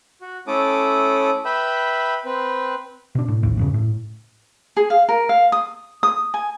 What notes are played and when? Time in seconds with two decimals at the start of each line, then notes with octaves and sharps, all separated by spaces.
0.21 F#4
0.47 A3 C#4 E4 A4 D6 D#6
1.45 B4 E5 G5 B5
2.25 C4 B4
3.15 B2 D4
3.28 A2
3.43 A#1 D#2 A2
3.57 E2 G2 C#3
3.74 A2
4.77 G#4
4.90 F5
5.09 A#4
5.29 F5
5.52 D#6
6.03 D#6
6.34 G#5